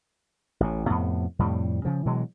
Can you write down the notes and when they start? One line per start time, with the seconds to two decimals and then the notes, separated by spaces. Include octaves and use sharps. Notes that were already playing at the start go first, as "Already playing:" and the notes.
0.60 A1 A2
0.88 F2 A2 C3 B3
1.39 F2 A2 C3 G3
1.85 C#3 F3
2.05 B2 E3 F#3 G#3